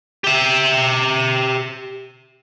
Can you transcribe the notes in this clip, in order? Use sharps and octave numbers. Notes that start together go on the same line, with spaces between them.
G4 E5